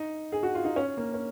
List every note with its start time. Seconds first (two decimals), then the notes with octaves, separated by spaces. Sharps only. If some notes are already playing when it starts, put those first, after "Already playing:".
Already playing: D#4
0.32 G#4
0.43 F#4
0.55 F4
0.65 D#4
0.76 C#4
0.97 A#3
1.14 C#4